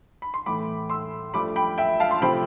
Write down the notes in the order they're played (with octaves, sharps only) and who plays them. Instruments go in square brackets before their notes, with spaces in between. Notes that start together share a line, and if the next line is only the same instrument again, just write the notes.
[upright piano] B5
C6
A2 E3 A3 B5 D6
C6 E6
G2 F3 A3 D4 B5 D6
G5 B5
E5 G5
F5 A5
C6
C3 F3 A3 C4 G5 B5